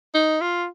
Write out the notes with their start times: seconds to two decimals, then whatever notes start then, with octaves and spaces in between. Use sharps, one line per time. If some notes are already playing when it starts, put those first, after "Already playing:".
0.14 D#4
0.41 F4